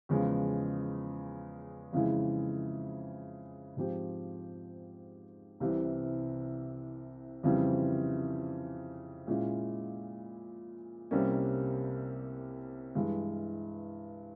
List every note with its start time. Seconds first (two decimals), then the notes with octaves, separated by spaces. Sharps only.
0.09 E2 C#3 F3 G#3 C#4
1.93 F2 C#3 E3 G#3 E4
3.76 G#2 F3 C4 G4
5.60 C2 C3 E3
7.43 F2 C#3 E3 G3 C4
9.27 A#2 G#3 C#4 E4
11.11 C2 C3 G3 A#3 C#4
12.95 G2 E3 G#3